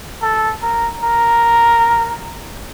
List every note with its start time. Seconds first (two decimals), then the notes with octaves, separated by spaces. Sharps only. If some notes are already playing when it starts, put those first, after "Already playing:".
0.22 A4
0.62 A#4
1.03 A#4